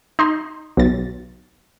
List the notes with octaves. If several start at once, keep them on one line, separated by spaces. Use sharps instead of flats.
D#4 C6
B1 A6